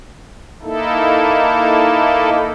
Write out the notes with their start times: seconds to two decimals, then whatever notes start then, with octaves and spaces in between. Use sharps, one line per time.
0.63 A#3 D#4 E4 A4